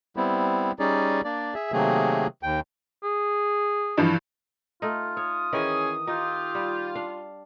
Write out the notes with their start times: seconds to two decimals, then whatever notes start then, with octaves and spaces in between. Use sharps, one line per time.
0.17 G3 B3 C4 E4
0.79 G3 C#4 D#4 G#4 D5
1.24 A#3 D4 D5
1.54 G#4 E5
1.72 C3 D#3 F#3 A3 A#3 G#4
2.43 D#2 G5
3.03 G#4
3.97 G2 E3 F3
4.82 A3 D#4 F4
5.17 C#5 D#6
5.53 D#3 E3 C#4 G#4
6.07 D#4 F4 G4
6.55 G3
6.96 D4 F5